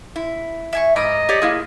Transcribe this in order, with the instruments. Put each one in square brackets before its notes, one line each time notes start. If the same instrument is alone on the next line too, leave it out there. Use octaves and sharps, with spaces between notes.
[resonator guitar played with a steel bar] E4
[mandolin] E5 G#5 C#6
[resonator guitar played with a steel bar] G#2 [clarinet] D#5 [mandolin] A#5 B5 D6
[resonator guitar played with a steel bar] G4 C#5 D5
[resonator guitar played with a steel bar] A#3 E4 G#4 [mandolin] F4